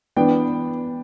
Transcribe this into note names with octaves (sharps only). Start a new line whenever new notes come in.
E3 B3 D4 G5